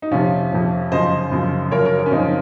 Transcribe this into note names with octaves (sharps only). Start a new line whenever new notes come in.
D#4
F2 C3 F3 C#4 F4
F2 C3 F3
F#2 C#3 F3 C5 D#5
F#2 C#3 F3
F#2 C#3 F3 A#4 C#5
A#4 C#5
A#4 C#5
C#4
F#2 C#3 F3 C4 D#4